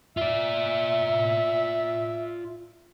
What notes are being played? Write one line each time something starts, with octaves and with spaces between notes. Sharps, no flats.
F4 D5 E5